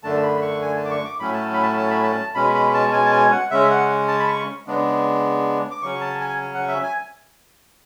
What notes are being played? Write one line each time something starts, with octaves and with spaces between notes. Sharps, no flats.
F#2 D3 A3 D4 A5
B5
C#6
G#5
A5
D6
C#6
D6
A2 F#3 A3 C#4 B5
A5
B5
A5
A5
B5
A5
B2 G#3 C#4 B5
B5
A5
G#5
A5
G#5
F#5
C#3 G#3 C#4 E5
F#5
A5
B5
C#6
C#3 G#3 B3 D4
D6
C#3 F#3 C#4 C#6
A5
G#5
F#5
E5
G#5